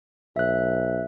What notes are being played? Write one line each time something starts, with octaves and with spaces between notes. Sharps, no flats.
B1 E5 F#6